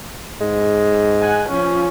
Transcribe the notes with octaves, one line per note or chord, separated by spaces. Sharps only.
G#2 G#3
F#5 G#5
F3 C#4 F4